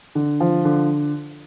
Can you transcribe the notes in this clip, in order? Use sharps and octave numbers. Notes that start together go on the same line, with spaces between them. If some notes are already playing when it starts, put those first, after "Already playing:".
D3
F3
D3